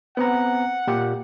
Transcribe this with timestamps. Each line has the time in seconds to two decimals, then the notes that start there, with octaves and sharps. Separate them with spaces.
0.17 B3 C4 F#5 A#5
0.87 A#2 F4 G4